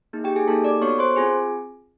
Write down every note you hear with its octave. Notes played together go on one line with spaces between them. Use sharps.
A#3 D#4 G#4
G4 G5
G#4 G#5
A#3 D#4 G4 A4 A5
D5 D6
B3 D4 F#4 A4 C#5 C#6
C5 C6
C4 F4 G#4 G#5